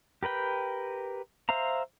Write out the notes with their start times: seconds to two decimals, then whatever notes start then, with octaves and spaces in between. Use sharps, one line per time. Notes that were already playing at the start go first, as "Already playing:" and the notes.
0.23 G4 A#4 B4 G5
1.49 C5 E5 F5 A#5